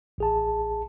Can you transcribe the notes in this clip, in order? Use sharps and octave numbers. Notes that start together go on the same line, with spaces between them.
A1 G#4 A5